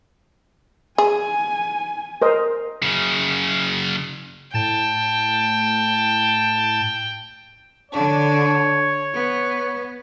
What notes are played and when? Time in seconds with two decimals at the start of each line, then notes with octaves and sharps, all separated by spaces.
0.98 G#4 G#5
2.22 A#4 C5 D#5
2.82 F#2 C#3
4.54 A2 G5 A5 A6
7.92 D3 D4 C#5
9.13 B3